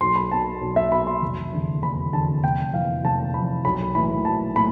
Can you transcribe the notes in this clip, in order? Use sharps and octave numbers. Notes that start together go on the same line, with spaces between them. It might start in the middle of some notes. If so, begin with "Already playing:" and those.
B1 C6
B5
B2 A5
B1
E5
B2 B5
C6
F1
E2 D3
F1 B5
E2 D3 A5
F1 G5
F2 E3 F5
F1 A5
F2 E3 B5
B1 B5
A2 E3 B5
B1 A5
A2 B5